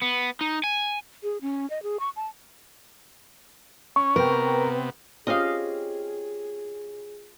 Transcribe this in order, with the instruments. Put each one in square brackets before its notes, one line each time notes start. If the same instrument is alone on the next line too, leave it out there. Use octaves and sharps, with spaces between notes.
[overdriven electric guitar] B3
D#4
G#5
[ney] G#4
C#4
D#5
G#4
C#6
A5
[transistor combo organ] C#4 [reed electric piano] C#6
[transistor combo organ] C3 B3 [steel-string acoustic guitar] A#4 [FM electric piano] B4 G5
[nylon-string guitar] C4 C#4 G4 [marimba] F4 D#6 [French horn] G#4 [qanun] D#5 F5